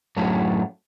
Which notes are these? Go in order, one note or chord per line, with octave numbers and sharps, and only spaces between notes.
F#2 A2 F#3 A3 F5